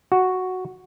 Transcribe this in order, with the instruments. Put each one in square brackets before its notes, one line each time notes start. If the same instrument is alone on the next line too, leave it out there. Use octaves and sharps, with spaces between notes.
[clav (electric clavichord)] F#4